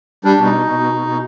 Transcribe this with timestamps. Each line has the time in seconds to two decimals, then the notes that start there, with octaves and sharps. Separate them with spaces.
0.24 G3 D4
0.37 B2
0.45 D#4
0.52 B2
0.66 B2
0.80 B2
0.93 B2
1.07 B2